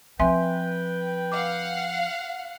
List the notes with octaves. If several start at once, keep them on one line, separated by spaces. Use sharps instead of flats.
F3 C4 B4 E5 G5 G#5 C6
F5 F#5 D6